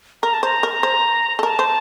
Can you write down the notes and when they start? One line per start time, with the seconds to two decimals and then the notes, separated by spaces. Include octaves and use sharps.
0.23 A#4 A#5
0.34 A5
0.43 C5 A#5
0.63 A#4
0.83 C5
1.39 A4
1.43 A#4 A5
1.59 C5